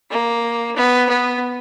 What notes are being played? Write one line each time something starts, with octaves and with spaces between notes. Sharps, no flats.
A#3
B3
B3